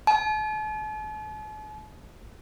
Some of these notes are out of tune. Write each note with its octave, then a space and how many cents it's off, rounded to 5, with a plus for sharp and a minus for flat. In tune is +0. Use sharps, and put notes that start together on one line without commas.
A5 -45